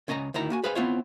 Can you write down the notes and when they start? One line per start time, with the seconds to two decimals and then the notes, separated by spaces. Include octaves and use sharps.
0.08 C#2 C#4 D#5 A5 A#5
0.34 D2 D#3 E4 A#5
0.50 A#3 F#4 G#5
0.64 G#4 B4 C5 F5 G#5 B5
0.75 B3 C4 E4 F4 C5 C#5